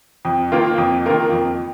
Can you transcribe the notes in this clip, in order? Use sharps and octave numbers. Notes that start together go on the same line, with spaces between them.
F2
D#3 A#3 F4 A#4
F2
D#3 A#3 F4 A#4
F2